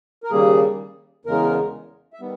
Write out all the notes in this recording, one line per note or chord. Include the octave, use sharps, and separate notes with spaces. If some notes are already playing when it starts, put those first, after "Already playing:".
A#4
D#2 C#3 G3 A#3 G#4
E2 C#3 G#3 A#4
E5
D#3 G3 B3